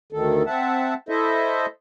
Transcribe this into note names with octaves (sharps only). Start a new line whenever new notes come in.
D2 D#3 A4
C4 E5 F#5 A5
E4 A4 C5 D#5 E5